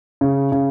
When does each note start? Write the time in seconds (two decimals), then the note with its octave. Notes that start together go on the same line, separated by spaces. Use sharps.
0.21 C#3
0.52 C#3